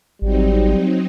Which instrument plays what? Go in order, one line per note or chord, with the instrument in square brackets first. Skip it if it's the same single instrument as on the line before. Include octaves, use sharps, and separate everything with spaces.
[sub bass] G#1 [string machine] F#3 C4 D#4 [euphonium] G3